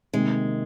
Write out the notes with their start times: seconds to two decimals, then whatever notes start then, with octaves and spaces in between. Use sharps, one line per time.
0.13 C3 D#3 G#3 A#3